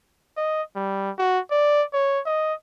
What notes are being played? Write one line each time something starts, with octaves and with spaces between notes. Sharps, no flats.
D#5
G3
F#4
D5
C#5
D#5